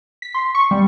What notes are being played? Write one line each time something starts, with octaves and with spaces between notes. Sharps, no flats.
B6
C6
C#6
G3